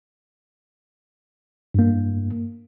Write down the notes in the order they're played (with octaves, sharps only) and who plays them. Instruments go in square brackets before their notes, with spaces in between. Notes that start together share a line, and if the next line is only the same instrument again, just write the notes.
[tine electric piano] G2 A#3